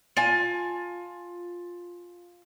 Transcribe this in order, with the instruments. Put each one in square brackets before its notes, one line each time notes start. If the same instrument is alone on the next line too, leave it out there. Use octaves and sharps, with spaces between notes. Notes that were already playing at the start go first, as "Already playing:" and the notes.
[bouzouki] F4 G#5 A5